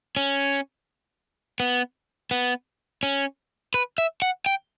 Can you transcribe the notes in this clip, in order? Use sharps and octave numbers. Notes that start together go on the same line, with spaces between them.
C#4
B3
B3
C#4
B4
E5
F#5
G5